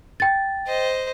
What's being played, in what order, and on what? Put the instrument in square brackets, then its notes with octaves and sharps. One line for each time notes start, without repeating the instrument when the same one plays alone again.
[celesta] G5 A6
[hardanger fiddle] C5 D#5